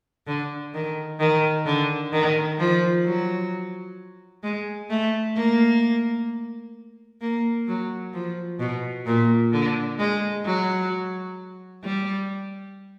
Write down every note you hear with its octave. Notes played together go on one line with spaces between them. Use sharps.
D3
D#3
D#3
D3
D#3
F3
F#3
G#3
A3
A#3
A#3
F#3
F3
B2
A#2
D3
G#3
F#3
G3